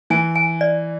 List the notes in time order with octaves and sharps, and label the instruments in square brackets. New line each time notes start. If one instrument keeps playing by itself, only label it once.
[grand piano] E3 [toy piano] G#5
[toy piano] G#5
D5